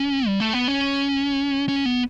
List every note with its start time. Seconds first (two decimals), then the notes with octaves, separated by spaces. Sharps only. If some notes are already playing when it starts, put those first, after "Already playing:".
Already playing: C#4
0.27 G3
0.40 A3
0.53 B3
0.68 C#4
1.69 C#4
1.85 B3